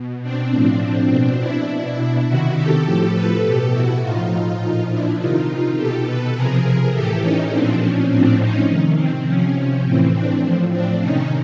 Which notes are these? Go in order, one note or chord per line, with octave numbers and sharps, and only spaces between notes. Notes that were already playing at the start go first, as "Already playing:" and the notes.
Already playing: B2
C4 D4
A2 F3
C4 D4
B2 C4 D4
D4 E4
B2 D4 E4
C3 D#3 E4 F#4
G4 A4
A2 F3
A4 B4
B2 G4 A4
E4 F#4
A2 F3 D#4 F4
A#2 F3
D4 E4
C3 D#3 D#4 F4
B2 G4 A4
A4 B4
C3 F3 G#4 A#4
A2 E3 G4 A4
C#4 D#4
A#2 F3 C4 D4
C#4
A2 F3 C4 D4
C#4 D#4
C3 D#3
C4
C3 F3 C#4
A2 E3 C4
C4 D4
A2 F3
C4 D4
C3 D#3 C#4 D#4